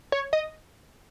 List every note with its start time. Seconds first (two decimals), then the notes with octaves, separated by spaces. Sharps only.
0.12 C#5
0.33 D#5